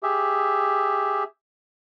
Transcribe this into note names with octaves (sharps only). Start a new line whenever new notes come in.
G4 G#4 E5